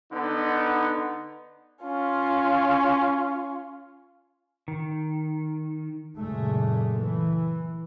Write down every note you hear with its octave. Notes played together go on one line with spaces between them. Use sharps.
D3 B3 D#4
C#4 F4
D#3
F#1 A#2 G#3 A3
E3